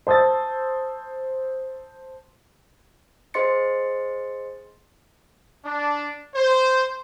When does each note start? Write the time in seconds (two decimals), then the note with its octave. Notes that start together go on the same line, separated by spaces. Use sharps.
0.07 C5 A5 D#6 E6 A6
3.34 G#4 C5 D#5 C6 A6 C#7
5.65 D4
6.33 C5